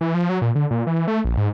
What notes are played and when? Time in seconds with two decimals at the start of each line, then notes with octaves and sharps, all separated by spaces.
0.01 E3
0.14 F3
0.29 F#3
0.42 A#2
0.55 D3
0.71 A#2
0.87 E3
1.08 A3
1.25 A#1
1.37 G#2